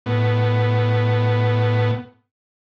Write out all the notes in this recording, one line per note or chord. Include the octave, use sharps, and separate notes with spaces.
A2 B3